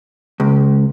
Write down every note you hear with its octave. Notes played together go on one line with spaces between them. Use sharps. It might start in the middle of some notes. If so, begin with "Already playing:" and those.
C#2